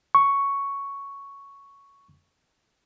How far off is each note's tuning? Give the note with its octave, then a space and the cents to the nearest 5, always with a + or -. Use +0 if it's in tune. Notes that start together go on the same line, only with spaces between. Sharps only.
C#6 +5